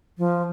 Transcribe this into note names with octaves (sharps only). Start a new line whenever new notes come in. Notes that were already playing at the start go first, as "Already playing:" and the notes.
F3